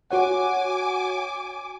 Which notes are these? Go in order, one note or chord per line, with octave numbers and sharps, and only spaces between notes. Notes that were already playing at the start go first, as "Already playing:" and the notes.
F#4 C#5 F#5 G#5 D6